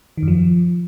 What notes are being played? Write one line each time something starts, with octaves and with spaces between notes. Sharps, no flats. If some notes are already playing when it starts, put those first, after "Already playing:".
D#3
F#2
F3